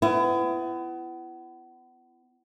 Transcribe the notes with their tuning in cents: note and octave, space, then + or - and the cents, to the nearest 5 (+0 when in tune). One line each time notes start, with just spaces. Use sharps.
B3 +30 E4 +35